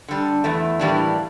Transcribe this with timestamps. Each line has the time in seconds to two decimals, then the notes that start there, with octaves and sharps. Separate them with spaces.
0.08 D3 G3 D4
0.44 E2 E3 A3
0.79 A2 E3 G3 A#3 D4